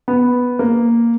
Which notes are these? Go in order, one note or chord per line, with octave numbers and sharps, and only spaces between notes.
B3
A#3